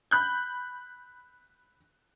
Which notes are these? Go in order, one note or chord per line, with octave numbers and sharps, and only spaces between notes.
B5 F#6 G6